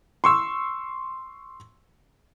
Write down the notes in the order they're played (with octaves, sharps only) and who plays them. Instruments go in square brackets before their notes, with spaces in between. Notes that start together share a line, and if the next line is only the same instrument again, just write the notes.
[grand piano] C6 C#6 E6